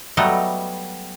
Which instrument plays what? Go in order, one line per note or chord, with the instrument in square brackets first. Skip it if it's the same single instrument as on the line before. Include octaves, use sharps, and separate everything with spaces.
[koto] F#3 G3 A3 B3 A4 D#5